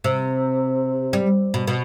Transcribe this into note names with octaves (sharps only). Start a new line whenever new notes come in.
C3
G3
B2
B2